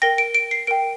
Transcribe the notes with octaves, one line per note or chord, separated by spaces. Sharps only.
A#4 G5 A#6
D7
D7
C7
A#4 G5 D7